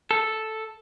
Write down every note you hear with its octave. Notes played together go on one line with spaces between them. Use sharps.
A4